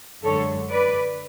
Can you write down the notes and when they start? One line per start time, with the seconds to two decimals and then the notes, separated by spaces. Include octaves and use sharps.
0.24 F#2 D3 G#3 A4 C#5
0.68 B4 D5